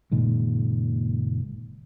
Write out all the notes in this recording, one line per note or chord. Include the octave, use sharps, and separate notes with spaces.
F#1 A#2 D#3 G#3